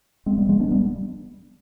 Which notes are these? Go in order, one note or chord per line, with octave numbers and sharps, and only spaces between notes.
G#3 C4
G3 B3
F3 G#3
B3 D4
G3 B3